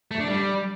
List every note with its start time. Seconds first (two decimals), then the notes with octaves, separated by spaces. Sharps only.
0.11 A3
0.20 D4
0.28 G3